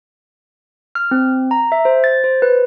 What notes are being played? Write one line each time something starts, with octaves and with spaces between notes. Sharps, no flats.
F6
C4
A#5
E5
C5
A6
C5
B4